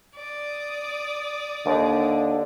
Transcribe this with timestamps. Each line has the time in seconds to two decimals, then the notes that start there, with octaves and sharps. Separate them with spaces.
0.17 D5 D#6
1.66 D#2 D3